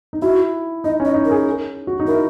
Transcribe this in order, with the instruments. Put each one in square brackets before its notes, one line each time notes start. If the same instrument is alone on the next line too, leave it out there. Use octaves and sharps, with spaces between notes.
[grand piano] D#4
[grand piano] E4 [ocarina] F#4
[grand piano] D#4 [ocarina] D#5
[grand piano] C#4
[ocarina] D#5
[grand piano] D#4
[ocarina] A#4
[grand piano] G#4
F#4
D#4
[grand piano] E4 [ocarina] A#4